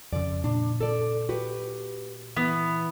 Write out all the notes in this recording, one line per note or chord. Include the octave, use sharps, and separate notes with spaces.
F2 C#3 D5
A#2 D4
A4 D5
F#4 G4 B4
E3 B3